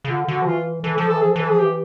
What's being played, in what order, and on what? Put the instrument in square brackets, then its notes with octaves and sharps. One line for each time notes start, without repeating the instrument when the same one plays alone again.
[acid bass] C#3
[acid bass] D3 [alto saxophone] F4
[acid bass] D3 [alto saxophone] F#4
[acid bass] F3
[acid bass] E3 [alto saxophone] F4
[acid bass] E3 [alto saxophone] A4
[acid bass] F3 [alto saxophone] A4
[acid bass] E3 [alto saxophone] A4
[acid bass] F3 [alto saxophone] G#4
[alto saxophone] A4
[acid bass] E3
[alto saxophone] A4
[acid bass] F3 [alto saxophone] G#4
[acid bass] E3 [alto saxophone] G4